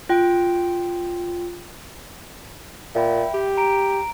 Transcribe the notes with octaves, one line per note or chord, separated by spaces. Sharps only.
F4 G5
A#2 E5 G5 B5
G4
A#5 D7